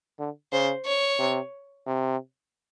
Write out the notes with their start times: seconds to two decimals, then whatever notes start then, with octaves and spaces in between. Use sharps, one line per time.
0.19 D3
0.52 C#3 C5
0.86 C#5
1.19 C3
1.86 C3